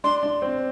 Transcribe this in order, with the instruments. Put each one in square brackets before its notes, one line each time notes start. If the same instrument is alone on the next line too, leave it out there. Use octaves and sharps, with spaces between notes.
[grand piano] D4 [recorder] C6
[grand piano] D4
C4